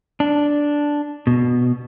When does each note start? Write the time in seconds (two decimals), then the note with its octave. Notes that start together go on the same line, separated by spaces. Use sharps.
0.20 D4
1.27 B2